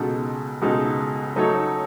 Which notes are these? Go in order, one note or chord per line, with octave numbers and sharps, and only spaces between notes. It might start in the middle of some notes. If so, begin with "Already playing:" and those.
Already playing: C#2 B2 G#3 D#4 A4
C#2 B2 G#3 D#4 A4
F#3 A3 D#4 A4 C#5